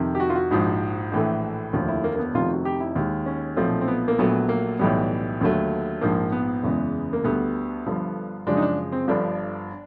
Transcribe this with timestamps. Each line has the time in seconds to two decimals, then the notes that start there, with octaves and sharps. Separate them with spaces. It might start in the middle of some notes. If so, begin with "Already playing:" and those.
Already playing: F2 C3 D#3
0.15 G4
0.20 F#4
0.30 F4
0.35 F#4
0.51 A#1 G#2 F3
1.12 A#1 A2 E3 A3
1.73 F1 D#2 D3 F3 A3
1.88 E4
2.04 A#3
2.16 A#3
2.19 B3
2.34 F1 F2 C3 D#3 F4
2.50 F#4
2.65 G4
2.80 E4
2.96 D#2 D#3 G#3
3.26 C#4
3.57 B1 A#2 F3 A3 C4
3.81 C4
3.88 B3
4.08 A#3
4.19 A#1 A#2 F#3 A3 B3
4.49 A#3
4.79 B1 A2 E3 G3 B3
5.41 D#2 D3 F#3 A3
6.01 A#1 G#2 F3 A#3
6.32 B3
6.63 F#1 E2 C#3 E3 G#3
7.13 A#3
7.24 D2 D3 G3 B3
7.86 G1 G2 D3 F3
8.47 F#2 C#3 F3 G#3 D4
8.57 D#4
8.62 D4
8.92 C4
9.08 G1 G2 D3 F3 D4